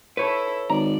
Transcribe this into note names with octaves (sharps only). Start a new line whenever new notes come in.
E4 A4 B4 C#5
G#1 D5 A#5